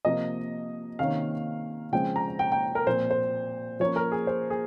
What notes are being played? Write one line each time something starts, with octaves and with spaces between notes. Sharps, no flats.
C3 F3 A#3 D#5
C3 D#3 A#3 C#4 F5
C#3 F3 G#3 C4 G5
A#5
G5
G5
A#4
A#2 F3 C4 C5
C5
F3 A#3 C#4 C#5
A#4
G#4
C5
G#4